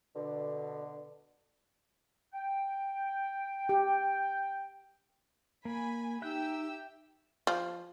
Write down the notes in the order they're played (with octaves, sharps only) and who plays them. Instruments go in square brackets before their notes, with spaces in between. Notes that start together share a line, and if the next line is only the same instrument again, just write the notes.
[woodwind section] B2 D3
G5
[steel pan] G4
[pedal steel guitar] A#3 [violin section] G#5 B5
[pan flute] D#4 [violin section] G4 G5 E6 [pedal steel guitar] E5 F#6 G6
[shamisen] F3